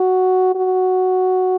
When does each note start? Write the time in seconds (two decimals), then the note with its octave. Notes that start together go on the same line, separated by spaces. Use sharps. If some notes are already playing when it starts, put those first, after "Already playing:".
Already playing: F#4
0.55 F#4